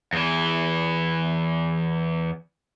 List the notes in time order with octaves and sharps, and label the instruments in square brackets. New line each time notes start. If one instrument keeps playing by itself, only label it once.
[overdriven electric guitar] E2 E3